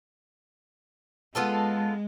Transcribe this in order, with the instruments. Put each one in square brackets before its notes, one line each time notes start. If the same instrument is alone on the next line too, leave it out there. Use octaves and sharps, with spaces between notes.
[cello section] G#3 [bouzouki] B3 F4 A4